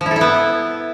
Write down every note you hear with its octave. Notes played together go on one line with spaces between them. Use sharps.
F3
E4
A4
E4
B3